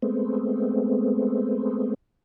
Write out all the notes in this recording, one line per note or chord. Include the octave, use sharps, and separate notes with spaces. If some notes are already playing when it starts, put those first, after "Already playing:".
G#3 A3 B3 C4